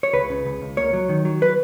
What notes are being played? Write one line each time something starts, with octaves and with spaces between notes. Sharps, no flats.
C#5
C#2 B4
C#3
C#2
C#2
A#3 C#5
F#3
D#3
F#3
B4